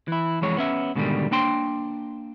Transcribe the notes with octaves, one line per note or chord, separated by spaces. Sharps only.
E3 E4
F2 E3 G#3 C#5
B3 C#4 E5
G#2 B2 D3 D#3 G3
A#3 D4 G5 C6